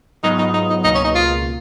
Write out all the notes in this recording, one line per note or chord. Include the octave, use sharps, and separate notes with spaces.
G#2 F#3 B3 D#4 F4
D#4
D#4
D#4
C#2 B2 A#3 D#4
C#4
D#4
F4